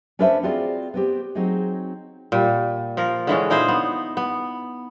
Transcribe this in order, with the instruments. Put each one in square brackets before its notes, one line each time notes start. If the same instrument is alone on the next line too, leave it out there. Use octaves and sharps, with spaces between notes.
[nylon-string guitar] C#4 D4 A4 B4 C5 E5
C4 F4 F#4 G#4 D5
B3 C4 G4
F#3 C4 D#4 F#4 G#4
[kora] A#2 G3
F3 A#4
D3 E3 G#3 C#4
A#2 D#4 E4 C5
B3
B3